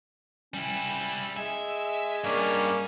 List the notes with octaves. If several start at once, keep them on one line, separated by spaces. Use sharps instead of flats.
G3 C#4 E4
G#3 E5 G#5
G2 A#3 C#4 D5